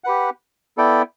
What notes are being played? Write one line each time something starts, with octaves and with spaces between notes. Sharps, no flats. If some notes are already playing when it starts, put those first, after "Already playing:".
G4 B4 F#5
B3 E4 A4 D5 G5